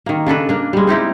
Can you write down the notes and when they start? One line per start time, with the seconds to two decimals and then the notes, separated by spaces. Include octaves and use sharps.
0.06 D#3 A#3
0.26 C#3 D4 A4 B4
0.49 A#3 D4
0.73 G3 G#3
0.87 C4 D#4 E4 G4